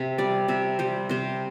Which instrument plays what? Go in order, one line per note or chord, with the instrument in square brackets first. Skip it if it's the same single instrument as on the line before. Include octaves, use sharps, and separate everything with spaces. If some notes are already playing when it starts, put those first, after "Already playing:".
Already playing: [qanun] C3 E5
G3 D5
C3 E5
G3 C5
C3 C5